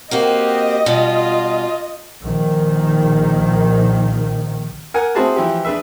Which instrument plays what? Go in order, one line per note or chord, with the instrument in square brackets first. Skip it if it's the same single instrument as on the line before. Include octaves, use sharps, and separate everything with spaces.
[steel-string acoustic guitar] A#3 C4 F#4 [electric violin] G4 [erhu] D#5
[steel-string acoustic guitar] B2 G3 [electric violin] F4
[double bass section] A#1 D#3
[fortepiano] A#4 F#5 G#5
C4 E4 F#4 G#4 A5 B5
E3 F3 E4 G4
D4 G#4 B4 E5